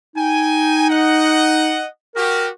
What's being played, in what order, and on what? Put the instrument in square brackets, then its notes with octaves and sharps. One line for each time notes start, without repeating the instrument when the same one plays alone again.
[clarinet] D#4 [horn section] G5 G#5
[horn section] D#5 F#5
[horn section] F#4 G4 [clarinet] A#4